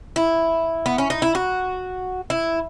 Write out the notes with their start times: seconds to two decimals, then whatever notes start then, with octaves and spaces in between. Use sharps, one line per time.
0.16 E4
0.86 B3
0.98 C#4
1.10 D#4
1.22 E4
1.35 F#4
2.30 E4